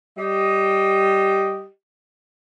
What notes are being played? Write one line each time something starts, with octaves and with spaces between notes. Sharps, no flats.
G3 G4 D#5